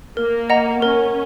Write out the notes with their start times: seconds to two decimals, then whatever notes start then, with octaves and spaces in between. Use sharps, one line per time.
0.17 A#3 A#4
0.50 D#5 F#5 A#5
0.82 C#4 A#4